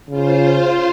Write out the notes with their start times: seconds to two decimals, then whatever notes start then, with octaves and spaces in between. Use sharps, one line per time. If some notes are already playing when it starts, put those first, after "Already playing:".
0.10 C#3 F4 C5